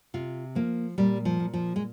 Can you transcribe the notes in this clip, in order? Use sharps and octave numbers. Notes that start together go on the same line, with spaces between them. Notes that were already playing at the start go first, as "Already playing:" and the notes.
C3 F4
F3 A#3
A#2 G3
F3
A#2
F3
G#3